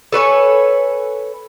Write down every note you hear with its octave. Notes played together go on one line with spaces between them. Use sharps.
A4 B4 C#5 G#5